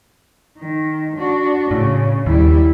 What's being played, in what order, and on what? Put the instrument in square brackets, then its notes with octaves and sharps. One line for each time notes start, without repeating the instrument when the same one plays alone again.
[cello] D#3
D4 F#4
[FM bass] A2 [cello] C#3
[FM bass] D#2 [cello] G3 E4